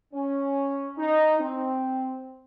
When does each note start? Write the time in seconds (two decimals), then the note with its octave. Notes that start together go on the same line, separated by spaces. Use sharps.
0.14 C#4
0.97 D#4
1.40 C4